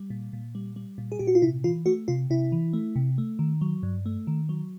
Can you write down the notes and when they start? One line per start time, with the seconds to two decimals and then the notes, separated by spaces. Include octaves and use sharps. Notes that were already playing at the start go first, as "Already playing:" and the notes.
Already playing: G3
0.10 A#2
0.33 A#2
0.55 G3
0.76 G3
0.98 A#2
1.12 G#4
1.19 A#2 G4
1.27 F#4
1.35 F4
1.42 C3 E4
1.64 E3 F4
1.86 A3 F#4
2.08 C3 F4
2.30 C3 E4
2.52 E3
2.73 A3
2.96 C3
3.18 A3
3.39 D#3
3.61 F#3
3.83 G2
4.06 A3
4.27 D#3
4.49 F#3